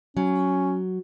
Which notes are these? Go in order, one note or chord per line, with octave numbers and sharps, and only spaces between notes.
F#3 C#4